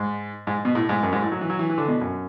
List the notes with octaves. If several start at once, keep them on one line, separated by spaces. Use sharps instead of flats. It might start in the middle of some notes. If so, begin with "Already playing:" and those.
Already playing: G#2
G#2
B2
A2
G#2
F#2
G#2
A2
F#3
E3
F#3
E3
E3
D3
B2
F#2